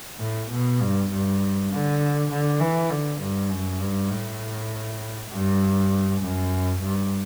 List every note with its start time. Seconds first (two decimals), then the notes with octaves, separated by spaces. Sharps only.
0.19 A2
0.50 B2
0.81 G2
1.10 G2
1.71 D3
2.31 D3
2.60 E3
2.91 D3
3.21 G2
3.51 F#2
3.80 G2
4.11 A2
5.31 G2
6.22 F#2
6.82 G2